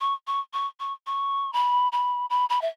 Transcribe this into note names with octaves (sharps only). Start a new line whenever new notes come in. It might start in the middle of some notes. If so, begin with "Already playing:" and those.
C#6
C#6
C#6
C#6
C#6
B5
B5
B5
B5
E5